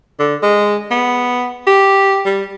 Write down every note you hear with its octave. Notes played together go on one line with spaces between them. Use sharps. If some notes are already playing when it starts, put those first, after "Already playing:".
D3
G#3
B3
G4
G3